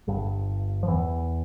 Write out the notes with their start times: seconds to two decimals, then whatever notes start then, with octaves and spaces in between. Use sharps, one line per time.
0.07 G1 G2
0.83 F3
0.88 E2 E3